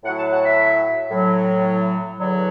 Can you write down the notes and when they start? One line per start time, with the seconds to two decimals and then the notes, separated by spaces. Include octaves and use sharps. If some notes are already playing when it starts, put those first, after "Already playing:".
0.04 A2 F#5
0.09 F#3
0.17 A5
0.31 F#5
0.44 E5
1.11 A2 F#3
2.18 E2 D3 F#3